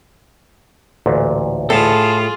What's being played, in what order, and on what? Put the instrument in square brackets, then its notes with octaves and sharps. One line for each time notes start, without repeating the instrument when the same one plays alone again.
[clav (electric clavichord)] A1 D2 A#2
[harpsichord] A2 [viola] F4 G#4 [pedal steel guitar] A4 A5